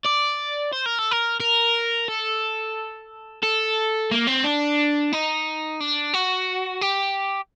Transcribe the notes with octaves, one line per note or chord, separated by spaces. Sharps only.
D5
C5
A#4
A4
A#4
A#4
A4
A4
A#3
C4
D4
D#4
D4
F#4
G4